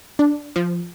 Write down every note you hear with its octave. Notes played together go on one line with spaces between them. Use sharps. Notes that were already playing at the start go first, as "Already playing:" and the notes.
D4
F3